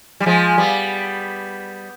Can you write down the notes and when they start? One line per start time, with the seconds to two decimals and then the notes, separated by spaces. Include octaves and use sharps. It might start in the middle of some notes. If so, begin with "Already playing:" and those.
0.20 G3
0.26 F3 G#3
0.58 G3 B3